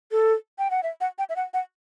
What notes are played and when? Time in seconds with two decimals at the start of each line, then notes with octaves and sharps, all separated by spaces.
0.11 A4
0.59 G5
0.71 F#5
0.83 E5
1.01 F#5
1.19 G5
1.29 E5
1.36 F#5
1.54 F#5